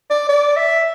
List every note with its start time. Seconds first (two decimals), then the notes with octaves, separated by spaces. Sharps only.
0.10 D5
0.29 D5
0.56 E5